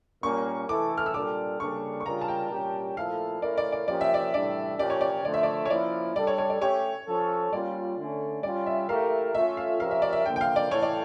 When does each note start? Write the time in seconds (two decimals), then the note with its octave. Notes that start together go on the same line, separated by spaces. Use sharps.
0.23 A#2 G3 A#3 C#4 C#6
0.69 E3 A3 E4 A4 D6
0.98 F6
1.06 E6
1.14 A#2 G3 D4 A4 D6
1.60 C#3 G3 A#3 D4 A4 C#6
2.00 C#6
2.05 C#3 G3 D4 F4 A#4 A#5
2.21 A5
2.28 G5
2.51 A#2 G3 C#4 G4
2.96 A#2 F3 A3 E4 A4 F5
3.42 A3 C#4 E4 A#4 D5
3.58 D5
3.72 D5
3.87 F3 A#3 C#4 G4 A#4 D5
4.01 E5
4.14 D5
4.33 A2 E3 G3 D4 D5
4.78 A#2 F3 C#4 G4 D5
4.90 C#5
5.01 D5
5.25 D3 F3 A3 D5
5.34 E5
5.43 D5
5.65 C#5
5.70 F3 A#3 C#4 E4 D5
6.16 G3 D4 A4 D5
6.27 C#5
6.38 C#5
6.50 D5
6.61 A3 C#4 G4 C#5
7.07 F3 C#4 F4 A4
7.52 G3 A#3 C#4 F4 D5
7.98 D3 A3 C#4
8.43 G3 C#4 F4 D5
8.66 E5
8.89 A3 E4 G4 A#4 F5
9.34 A3 C#4 F4 A4 E5
9.57 F5
9.80 F3 C#4 G4 A#4 F5
9.91 E5
10.02 D5
10.13 E5
10.26 D3 F3 A#3 G5
10.36 G5
10.41 F5
10.56 D5
10.71 A2 E3 A3 E4 A4 C#5
10.82 D5